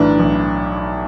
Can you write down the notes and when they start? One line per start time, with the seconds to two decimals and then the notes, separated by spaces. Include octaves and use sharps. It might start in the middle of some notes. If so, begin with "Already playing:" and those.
Already playing: B1 A2 E3 D4
0.19 B1